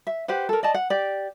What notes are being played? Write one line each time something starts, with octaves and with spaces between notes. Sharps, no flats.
E5
G4 B4 C5 F#5
A4 A#4
D5 D#5 A5
F#5
G4 D5